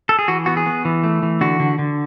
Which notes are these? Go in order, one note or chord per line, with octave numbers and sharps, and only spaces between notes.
A4
G#4
E3 F#4
B3 F#4
G#4
B3
E3
A3
E3
D3 F#4
D3
D3